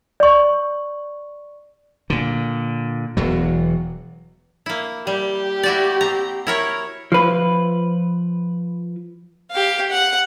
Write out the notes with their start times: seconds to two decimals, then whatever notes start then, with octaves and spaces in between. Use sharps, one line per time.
0.20 D5 C#6
2.10 A#2 D3
3.17 E1 E2 F#3
4.66 A#3 E4
5.07 G3 G4
5.63 E4 F#4 D5
6.01 C4 A#5
6.47 E4 A#4 C#5
7.12 F3 B4
9.52 G4 F5
9.91 F#5